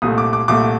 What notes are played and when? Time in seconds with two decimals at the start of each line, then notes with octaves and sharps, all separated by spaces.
0.02 C2 A#2 A3 D#6
0.18 D6
0.33 D6
0.48 C2 A#2 A3 D6